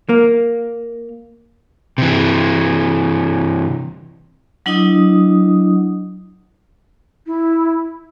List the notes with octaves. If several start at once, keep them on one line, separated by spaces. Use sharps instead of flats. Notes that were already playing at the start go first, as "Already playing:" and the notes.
A#3
C3 E3
F#3 D4 E4 D#5 D#6
E4